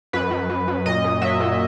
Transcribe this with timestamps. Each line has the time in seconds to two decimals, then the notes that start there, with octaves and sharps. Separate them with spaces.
0.13 F#2 B4
0.31 F#2
0.50 F#2
0.68 F#2
0.86 A#2 D#5
1.04 A#2
1.22 F#3 E5
1.40 A#2